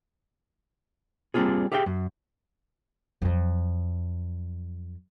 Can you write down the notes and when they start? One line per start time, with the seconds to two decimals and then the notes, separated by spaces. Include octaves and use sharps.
1.34 G3 A#3 C4 D4 F4 G#4
1.72 G4 G#4 E5 F5 G5
1.86 F#2
3.22 F2 F#3